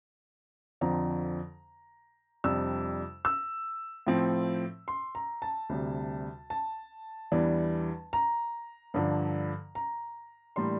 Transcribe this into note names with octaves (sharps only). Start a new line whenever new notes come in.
F2 D3 F3 C4 A#5
F2 C3 G3 D4 E6
E6
A2 F3 C4
C6
A#5
A5
D2 C3 G3
A5
E2 E3 G3 D4
A#5
G2 D3 F3
A#5
A2 E3 G3 A#3 D4 C6